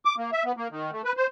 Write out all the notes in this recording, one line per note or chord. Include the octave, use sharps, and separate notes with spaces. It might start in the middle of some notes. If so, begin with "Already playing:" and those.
D6
A#3
E5
B3
A#3
D#3
A3
B4
C5